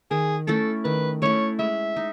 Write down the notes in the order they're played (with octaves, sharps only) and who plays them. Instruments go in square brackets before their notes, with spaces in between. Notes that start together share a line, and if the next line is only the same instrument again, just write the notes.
[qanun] D#3 [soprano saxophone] G#4
[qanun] A3 C#4 E4 [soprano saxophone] A4
[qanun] D#3 [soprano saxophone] B4
[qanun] A3 C#4 E4 [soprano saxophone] C#5
[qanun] G#3 [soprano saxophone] E5
[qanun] D#4